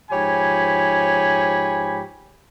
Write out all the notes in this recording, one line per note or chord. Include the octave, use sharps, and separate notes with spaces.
G#2 F3 G4 C#5 G#5 B5